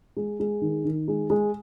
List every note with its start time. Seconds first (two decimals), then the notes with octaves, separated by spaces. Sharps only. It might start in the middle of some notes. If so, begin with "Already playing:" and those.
0.17 G#3
0.40 G#3
0.61 D#3
0.85 D#3
1.08 G#3
1.30 G#3